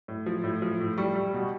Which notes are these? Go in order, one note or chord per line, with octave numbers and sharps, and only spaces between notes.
A2
F3
A2
F3
A2
G3 C#6
G3
B2